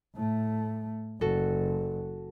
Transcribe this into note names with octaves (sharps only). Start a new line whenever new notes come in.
A2 A3
F#1 F#4 A4